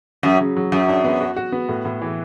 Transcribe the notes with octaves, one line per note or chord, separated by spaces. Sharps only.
F#2 F#3
C#3
F#3
F#2 F#3
D4
B3
F#4
F#4
B3
A2
A2
E3